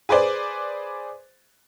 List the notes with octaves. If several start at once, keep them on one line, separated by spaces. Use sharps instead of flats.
G#4 B4 C5 D5